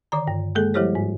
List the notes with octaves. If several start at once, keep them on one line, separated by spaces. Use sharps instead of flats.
D3 D#3 D5 A#5
G2
G#3 A#3 G#4 A4
F3 G3 E4 G4 C5 C#5
G#2